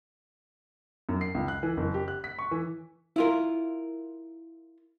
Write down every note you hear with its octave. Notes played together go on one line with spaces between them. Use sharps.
F#2
C7
C#2
F#6
E3
F#1
G4
F#6
B6
C#6
E3
E4 F4 A#4